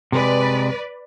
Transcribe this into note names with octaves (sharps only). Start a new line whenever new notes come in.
C3 G#3 B4 D5